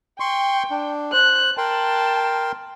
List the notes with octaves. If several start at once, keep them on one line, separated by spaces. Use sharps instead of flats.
G5 C6 C#6
D4
C5 F#6
A#4 G5 A5 C6